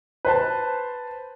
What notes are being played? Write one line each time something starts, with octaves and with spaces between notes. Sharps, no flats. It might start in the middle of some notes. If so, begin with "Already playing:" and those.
B4 C5 A5